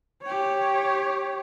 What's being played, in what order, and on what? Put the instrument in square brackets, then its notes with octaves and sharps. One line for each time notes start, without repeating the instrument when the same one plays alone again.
[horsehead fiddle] G4 C#5